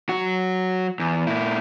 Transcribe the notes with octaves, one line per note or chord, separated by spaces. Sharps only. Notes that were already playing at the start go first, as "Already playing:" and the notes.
F#3 F#4
E2
A#2 E4